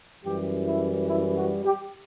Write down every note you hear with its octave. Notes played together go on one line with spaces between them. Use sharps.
F#2 E3 G3 G4
E4
E4
F#4
G4